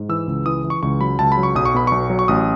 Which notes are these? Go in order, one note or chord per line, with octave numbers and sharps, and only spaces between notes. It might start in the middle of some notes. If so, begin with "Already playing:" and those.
Already playing: G#2
E3 E6
C#2
E3 D#6
E3
C#6
C#2 C#6
F#3 B5
C#2 A5
B5
F#3
C#6
B1 D#6
C#6
B2 B5
B1 C#6
F#3
C#6
A1 D#6